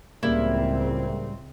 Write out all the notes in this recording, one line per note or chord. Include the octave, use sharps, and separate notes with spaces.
C#2 A2 C#3 G3 A#3 C4 E4